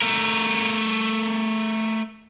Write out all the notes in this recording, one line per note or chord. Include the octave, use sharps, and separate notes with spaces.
A3 A#4